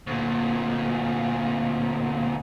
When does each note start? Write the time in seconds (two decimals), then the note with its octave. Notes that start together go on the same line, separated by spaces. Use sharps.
0.07 D2 A#2